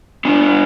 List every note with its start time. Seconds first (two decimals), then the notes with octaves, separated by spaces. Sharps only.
0.25 B3 D4
0.42 B3